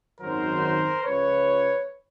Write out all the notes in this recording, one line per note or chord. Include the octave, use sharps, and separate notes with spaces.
G#1 F#2 D#3 F#3 A#4 C5
C#2 C#3 F3 B4 C#5